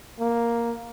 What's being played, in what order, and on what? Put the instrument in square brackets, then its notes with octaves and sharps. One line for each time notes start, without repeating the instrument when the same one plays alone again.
[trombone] A#3